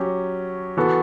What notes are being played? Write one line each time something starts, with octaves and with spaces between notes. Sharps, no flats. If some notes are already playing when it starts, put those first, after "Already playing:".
Already playing: F#3 C#4 G4
E3 B3 F#4 A4